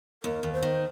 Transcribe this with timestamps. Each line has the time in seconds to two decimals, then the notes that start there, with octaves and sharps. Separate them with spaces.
0.23 D#2 A#4
0.43 D#2
0.53 C5
0.63 D#3